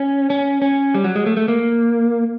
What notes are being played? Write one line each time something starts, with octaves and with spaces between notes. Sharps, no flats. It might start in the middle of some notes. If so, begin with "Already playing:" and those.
Already playing: C#4
C#4
C#4
G3
F#3
G#3
A3
A3
A#3